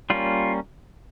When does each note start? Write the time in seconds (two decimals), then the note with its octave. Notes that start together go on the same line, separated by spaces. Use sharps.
0.10 G3 A#3 C#4 F4